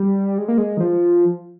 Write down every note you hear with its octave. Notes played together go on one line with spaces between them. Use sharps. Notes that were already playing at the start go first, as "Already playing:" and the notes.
Already playing: G3
G#3
A#3
G#3
D#3
F3